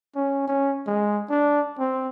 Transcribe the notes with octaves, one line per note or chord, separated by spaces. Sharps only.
C#4
C#4
G#3
D4
C4